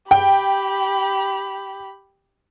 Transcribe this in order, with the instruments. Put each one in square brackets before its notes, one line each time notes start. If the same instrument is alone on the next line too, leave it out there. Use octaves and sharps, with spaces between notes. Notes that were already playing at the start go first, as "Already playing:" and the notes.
[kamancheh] G4 B5 [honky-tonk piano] G5